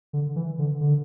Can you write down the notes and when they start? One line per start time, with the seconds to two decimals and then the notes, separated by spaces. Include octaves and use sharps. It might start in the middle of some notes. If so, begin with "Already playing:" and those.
0.13 D3
0.36 E3
0.59 D3
0.81 D3